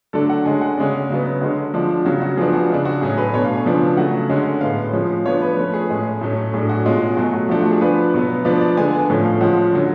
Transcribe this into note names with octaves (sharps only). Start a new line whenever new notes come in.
D3 F#3 A3 D4 A4
F#5
D3 G#3 C#4 G#5
F#5
C#3 G#3 C#4 D5
C#3 F#3 B3
D3 G#3 C#4 F#4
F3 G#3 D4
C#3 F#3 C#4 F#4
F#4
F3 B3 D4 G#4
F#4
C#3 G#3 D4
F#4
A2 F#3 C#4 G#4
B4
B2 A3 D4 C#5
F5
G#5
C#3 F3 B3 D4
C#3 F#3 A3 F#5
D3 G#3 C#4
A2 G#3 B3 F5
F3 G#3 C#4
F3 B3 D4 C#5
B4
F3 A3 C#4 B4
G#4
A2 G#3 C#4
A2 F#3 A3 C#4
A2 F#3 A3 D4 G#4
F#4
B2 G#3 C#4 F4
F#4
G#4
B2 F#3 A3 F#4
F#4
F3 A3 D4 F#4
F#4
G#4
F3 B3 D4 B4
B2 F#3 B3
F3 B3 D4 D5
D5
D3 G#3 B3 D4 G#5
G#5
G#5
A2 F3 A3 C#4
F5
F3 G#3 C#4 F#5
D3 F#3 C#4